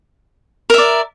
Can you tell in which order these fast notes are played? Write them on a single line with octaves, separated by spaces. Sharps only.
A#4 E5 D5